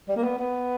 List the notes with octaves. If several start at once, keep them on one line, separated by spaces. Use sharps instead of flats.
G3
A#3
B3
B3